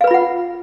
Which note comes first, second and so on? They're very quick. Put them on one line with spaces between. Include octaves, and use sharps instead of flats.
F5 B4 B5 F4 F#5